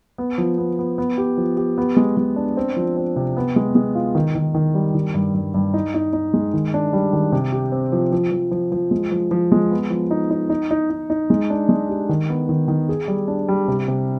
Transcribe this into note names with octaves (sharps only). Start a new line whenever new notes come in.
B3
F3
B3
B3
B3
G4
F3
G4
B3
G#3
G#3
D4
C4
F3
C4
C3
B3
G#3
G#3
F4
D#3
D#3
D#3
G3
D#3
G2
G2
G2
D#4
D#4
D#4
G#3
D#3
D4
G3
D#3
C3
G4
C4
F3
F3
F3
F3
F3
G#3
F3
F3
G#3
B3
F3
D#4
D#4
D#4
D#4
D#4
D#4
G#3
D4
G#3
G4
D#3
B3
D#3
D#3
G#4
G3
D4
G3
C3
C3